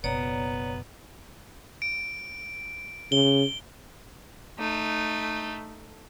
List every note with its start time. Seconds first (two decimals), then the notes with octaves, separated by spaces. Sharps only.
0.04 F#1 B2 B3 C#5 D5 A#5
1.82 D7
3.12 C#3 G7
4.59 A3 D#4